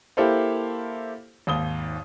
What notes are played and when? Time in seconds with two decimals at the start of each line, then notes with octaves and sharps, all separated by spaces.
0.17 A#3 E4 G4 A4 C5 F5
1.47 G#1 D#2 D#6 G7